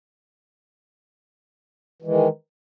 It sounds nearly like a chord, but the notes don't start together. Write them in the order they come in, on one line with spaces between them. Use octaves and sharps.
E3 G#3 D#3